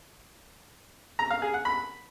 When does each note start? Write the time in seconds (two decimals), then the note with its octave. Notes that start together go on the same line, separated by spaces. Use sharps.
1.19 A#5
1.31 F5
1.42 G#4
1.54 F#5
1.65 B5